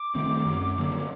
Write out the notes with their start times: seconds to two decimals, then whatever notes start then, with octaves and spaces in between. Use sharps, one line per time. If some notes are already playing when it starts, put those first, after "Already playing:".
Already playing: D6
0.15 D#3 A3 C4
0.46 F#2
0.78 D3 F#3 A#3